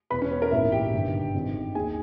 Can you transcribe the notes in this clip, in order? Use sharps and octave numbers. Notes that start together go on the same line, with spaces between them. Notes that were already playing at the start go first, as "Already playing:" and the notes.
E1 E2 B2 B4 B5
C#4 C#5
B3 B4
A#4
A#1 G#2 E3 E4 E5
G4 G5
G1 G2 D#3
G#1 G#2 D#3
D#2 D#3 G#4 G#5